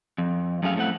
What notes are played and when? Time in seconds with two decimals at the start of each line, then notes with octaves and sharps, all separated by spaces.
0.18 F2
0.63 F#2 A3 G#4 F5
0.76 A2 A3 C4 F#5